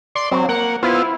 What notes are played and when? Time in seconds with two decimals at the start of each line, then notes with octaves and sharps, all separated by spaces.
0.15 D5 C6
0.31 F#3 C4
0.49 A#3 F#5
0.83 B3 E4 F4 C5